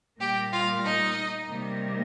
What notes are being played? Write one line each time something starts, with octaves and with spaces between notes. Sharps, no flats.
A#2 G3 A#3 G4 G5
F4 F5
D#4 D#5
C3 D#3 G3 A#3